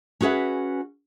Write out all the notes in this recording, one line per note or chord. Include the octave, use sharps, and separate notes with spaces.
C#4 F#4 G#4 B4 E5